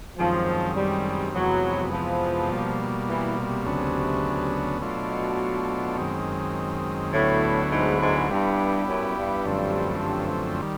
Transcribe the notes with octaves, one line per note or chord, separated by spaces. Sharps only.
F#2 D#3 F3 G#3 C4
G3
F2 C3 E3 F#3 G#3 B3
F3
B2 G3 A#3
E3
C3
D2 C#3 F#3 B3 D4
B2 F#3 A3 D4 F4
F#2 D#3 G#3 C4
D2 A2 D3 F#3 B3 E4
G#2
G#2
G2 G3 B3 E4 G4
F#2
G2
F#2 D3 F3 A3 C4
D#3 G3